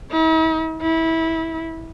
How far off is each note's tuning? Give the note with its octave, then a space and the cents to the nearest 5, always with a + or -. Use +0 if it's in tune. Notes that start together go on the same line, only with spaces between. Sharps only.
E4 -45
E4 -20